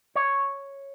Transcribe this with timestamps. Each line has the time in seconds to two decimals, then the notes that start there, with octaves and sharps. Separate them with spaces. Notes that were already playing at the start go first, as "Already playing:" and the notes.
0.15 C#5